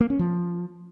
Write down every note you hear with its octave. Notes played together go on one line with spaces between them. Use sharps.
A#3
C#4
F3